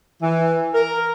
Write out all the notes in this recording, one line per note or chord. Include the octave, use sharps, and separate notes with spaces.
E3
A#4